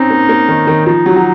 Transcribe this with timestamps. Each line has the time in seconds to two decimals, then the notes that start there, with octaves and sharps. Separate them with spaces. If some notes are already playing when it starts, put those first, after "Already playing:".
Already playing: C4 C#4 D#4
0.10 A#3
0.29 A#3
0.48 D#3
0.67 D#3
0.86 F3 D#4
1.06 F#3
1.16 F#3